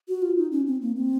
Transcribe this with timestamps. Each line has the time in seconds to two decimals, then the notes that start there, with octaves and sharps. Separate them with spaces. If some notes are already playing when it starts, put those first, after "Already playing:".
0.08 F#4
0.22 F4
0.37 D#4
0.52 C#4
0.67 C4
0.82 A#3
0.96 C4